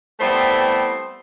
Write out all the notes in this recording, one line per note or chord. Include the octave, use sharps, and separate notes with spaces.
G3 A3 B3 C4 E4 C5